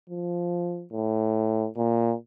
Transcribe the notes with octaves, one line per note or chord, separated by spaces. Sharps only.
F3
A2
A#2